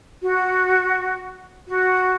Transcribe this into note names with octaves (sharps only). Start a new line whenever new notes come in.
F#4
F#4